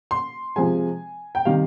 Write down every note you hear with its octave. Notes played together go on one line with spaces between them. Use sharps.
C6
C3 F3 G#3 G#5
G5
C3 D#3 G3 F5